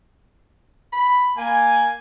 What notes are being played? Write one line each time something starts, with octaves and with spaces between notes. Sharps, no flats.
B5
A#3 G#5